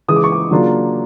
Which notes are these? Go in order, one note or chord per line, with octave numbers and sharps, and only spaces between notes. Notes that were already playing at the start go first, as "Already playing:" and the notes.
C#3 E3 G#3 D#6
D6
C#6
D6
C#3 F#3 A#3 D4 F4